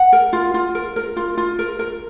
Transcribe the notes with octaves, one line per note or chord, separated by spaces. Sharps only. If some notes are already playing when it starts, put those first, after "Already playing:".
Already playing: F#5
A#4
F4
F4
A#4
A#4
F4
F4
A#4
A#4